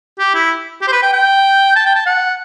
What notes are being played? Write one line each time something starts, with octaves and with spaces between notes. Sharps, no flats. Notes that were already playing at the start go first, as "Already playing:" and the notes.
G4
E4
G4
C5
B4
G5
G5
A5
G5
A5
F#5